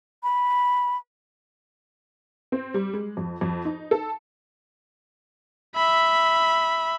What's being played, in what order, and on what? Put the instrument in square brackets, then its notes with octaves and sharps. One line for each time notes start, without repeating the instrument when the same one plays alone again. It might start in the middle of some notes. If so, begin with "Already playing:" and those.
[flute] B5
[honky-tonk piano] C4
G3
G#3
F2
F2
D#4
A4
[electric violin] E5 B5